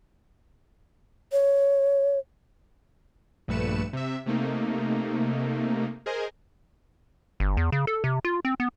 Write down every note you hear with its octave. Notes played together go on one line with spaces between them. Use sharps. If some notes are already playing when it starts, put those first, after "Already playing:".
C#5
A#1 G2 A3 B4 C#7 E7
C3 E5
C3 A3 A#3 D#4
G#4 A#4 C5 D#5 G#5
G1
E2
C#3
A4
C3
F4
C4
B3